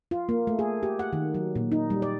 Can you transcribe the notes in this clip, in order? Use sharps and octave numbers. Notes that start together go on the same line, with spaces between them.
F4
A#3
A3
G#4
G4
F#5
D#3
F#3
A#2
D#4
G3
D5